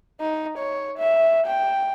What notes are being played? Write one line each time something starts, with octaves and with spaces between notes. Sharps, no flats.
D#4
C#5
E5
G5